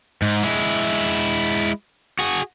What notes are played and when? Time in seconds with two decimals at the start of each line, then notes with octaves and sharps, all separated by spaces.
0.22 G#2
0.44 G#3 E4
2.19 F#4 G#4